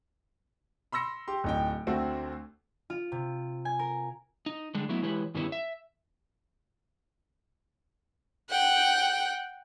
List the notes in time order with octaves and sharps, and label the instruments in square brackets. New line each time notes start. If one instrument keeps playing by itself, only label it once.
[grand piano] B5 C6 E6 A#6 C#7
G4 C6
D1 D#4 G5
D2 A3 C4 F#4
[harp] F4
C3
G#5
A#4
[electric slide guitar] D#4
D3 G3 G#3 D4
F#3 A3 B3 D#4 E4
E3 G#3 E4 G4 B4 C#5
G2 D#3 G3 B3 C#4 E4
E5
[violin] F#5 G5